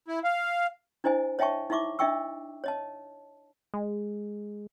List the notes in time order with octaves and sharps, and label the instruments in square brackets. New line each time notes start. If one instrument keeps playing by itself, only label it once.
[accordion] E4
F5
[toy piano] D4 E4 C5 D#5 G#5
C#5 D#5 E5 G5 A5 C#6
D#4 E4 E5 C#6 D6
D4 D#5 E5 G5 C#6 E6
C#5 D#5 A5
[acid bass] G#3